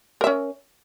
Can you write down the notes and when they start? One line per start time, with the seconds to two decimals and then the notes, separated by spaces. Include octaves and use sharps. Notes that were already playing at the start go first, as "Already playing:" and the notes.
0.21 A#4
0.24 E5
0.27 C#4